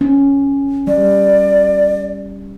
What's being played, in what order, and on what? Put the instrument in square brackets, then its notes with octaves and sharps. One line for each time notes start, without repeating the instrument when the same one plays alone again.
[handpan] C#4
[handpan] G3 [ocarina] D5